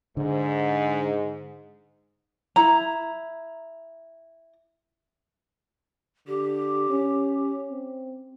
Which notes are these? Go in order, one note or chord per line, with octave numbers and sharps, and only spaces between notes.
G#2 D3
E4 A#5
D3 G4
C#4
C4